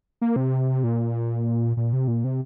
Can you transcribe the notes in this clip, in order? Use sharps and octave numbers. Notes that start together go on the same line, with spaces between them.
A#3
C3
A#2
A#2
C3
A#2
C3